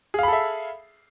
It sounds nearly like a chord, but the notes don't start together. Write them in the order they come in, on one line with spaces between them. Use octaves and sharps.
G#4 F5 B5 A4 E5